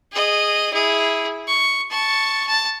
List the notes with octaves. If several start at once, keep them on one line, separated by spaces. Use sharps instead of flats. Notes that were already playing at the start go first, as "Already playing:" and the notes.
G#4 D#5
E4 G#4
C#6
A5 C#6
A5